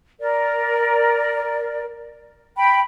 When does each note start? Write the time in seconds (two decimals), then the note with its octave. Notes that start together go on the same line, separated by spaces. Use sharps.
0.20 A#4 D5
2.56 G5 B5